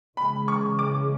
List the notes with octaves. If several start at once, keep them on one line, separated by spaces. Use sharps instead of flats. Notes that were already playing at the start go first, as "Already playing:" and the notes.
C#3 E3 G#3 C#4 B5
C#6
D6